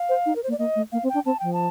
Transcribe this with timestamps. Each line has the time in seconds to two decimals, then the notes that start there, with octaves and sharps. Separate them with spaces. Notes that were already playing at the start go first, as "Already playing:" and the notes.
Already playing: F5
0.09 C5
0.26 D#4
0.36 A#4
0.43 C5
0.48 A#3
0.52 D5
0.59 A#3 D#5
0.76 A3
0.92 A#3 F5
1.03 C4
1.09 G5
1.14 D4
1.26 C4 A5
1.40 F3 G5
1.53 A5